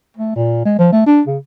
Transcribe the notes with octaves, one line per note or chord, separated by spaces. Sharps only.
A3
A#2
G#3
F3
A3
D4
C#3